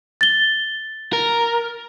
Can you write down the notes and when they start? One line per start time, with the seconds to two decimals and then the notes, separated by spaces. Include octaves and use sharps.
0.21 A6 G7
1.13 A#4